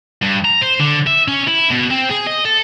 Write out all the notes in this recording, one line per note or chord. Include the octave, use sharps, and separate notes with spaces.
G2
A#5
C5
D3
E5
C#4
E4
B2
C4
G#4
D#5
A4